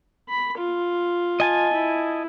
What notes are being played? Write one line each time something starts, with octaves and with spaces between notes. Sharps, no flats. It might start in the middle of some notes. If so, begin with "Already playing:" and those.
B5
F4
D#5 G#5 A5
E4